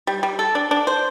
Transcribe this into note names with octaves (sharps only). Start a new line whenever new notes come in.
G3
G3
A4
D4
D4
C5